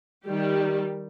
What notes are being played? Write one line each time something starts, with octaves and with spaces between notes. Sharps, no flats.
D#3 G3 G4